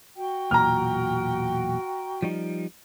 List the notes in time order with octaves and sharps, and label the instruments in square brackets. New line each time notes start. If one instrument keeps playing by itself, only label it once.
[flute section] F#4 G5
[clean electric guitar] B1 E2 A#2 [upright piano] A#5 F6
[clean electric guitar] F3 G3 D#4